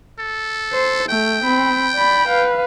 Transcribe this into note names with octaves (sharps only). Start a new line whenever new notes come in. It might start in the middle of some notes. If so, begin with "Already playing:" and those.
A4
C5
A3 G5
C4 B5
D5 B5
B4 F5